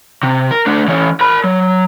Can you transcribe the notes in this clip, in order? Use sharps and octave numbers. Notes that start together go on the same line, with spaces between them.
C3
A#4
A3 D4
E3 C#4
A#4 B5
F#3